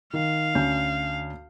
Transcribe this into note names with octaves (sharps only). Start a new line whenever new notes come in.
D#3 F5
D2 C#4 G6